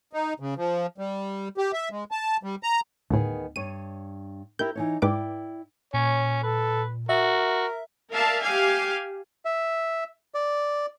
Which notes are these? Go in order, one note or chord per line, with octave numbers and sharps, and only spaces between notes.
D#4
C#3
F3
G3
G4
E5
G#3
A5
G3
A#5
D2 A2 D#3 B3 G#4
G2 C#5 D#7
E4 G4 A#4 G6
E3 D#4 C#5
G#2 E4 B4 D5 G5 D6
A#2 C#4 C#5
A4 B4
F#4 A#4 E5
A#4 D5 E5 F5 A5
G4 F5 G#5
E5
D5